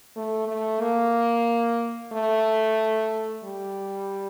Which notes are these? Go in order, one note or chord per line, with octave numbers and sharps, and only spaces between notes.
A3
A3
A#3
A3
G3